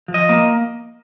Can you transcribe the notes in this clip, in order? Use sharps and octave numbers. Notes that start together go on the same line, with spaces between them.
F3
D#5
A#3